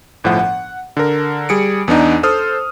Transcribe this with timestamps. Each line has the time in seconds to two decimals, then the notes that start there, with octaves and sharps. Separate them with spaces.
0.24 G1 A2 F3 F#5
0.39 F#5
0.97 D3 A#4
1.49 G3 G#4 C#7 D7
1.88 E2 B3 D4 D#4
2.23 A4 C5 D#6 F6